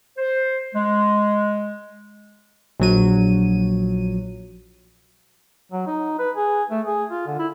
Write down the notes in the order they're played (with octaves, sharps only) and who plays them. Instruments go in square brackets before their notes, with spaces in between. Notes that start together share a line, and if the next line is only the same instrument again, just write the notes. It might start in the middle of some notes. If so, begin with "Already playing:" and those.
[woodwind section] C5
G#3
[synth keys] A#1 F#3 D#7
[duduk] F#3
D#4
B4
G#4
A3
G#4
F4
D3
E4